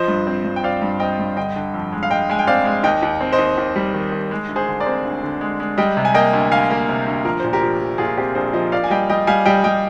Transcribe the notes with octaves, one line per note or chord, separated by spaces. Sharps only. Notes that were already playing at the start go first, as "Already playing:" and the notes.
Already playing: F3 C5 D#5
G2
C4
G2
G5
C4 D5 F5
G2
C4 D#5 G5
G2
D3 D#5 G5
D3
F2
G#3
F5
G#3 D#5 G5
G#3 G#5
G5
C4 D5 F5
G#3
D#2 D#5 G5
D#2
C4
C5 D#5
D#2
D#2
G3
D#3
D#2
G#3
D2
G#4 C5
D3
A#4 D5
C4
D2
D3
G#3
G#3
G3 D#5 G5
C3
G#5
A#3 D#5 G5
D2
D2 F5 G#5
A#3
C3
D2
F3 A#4
A#2 C5
G4 A#4
F3
F3
A#2 F4 G#4
C4 G4
A#1 G#4 C5
F3 C5 D#5
A#3 D5 F5
G#5
G3 D#5 G5
G3 D#5 G5
G3 F5 G#5
G3 D#5 G5
G3 D#5 G5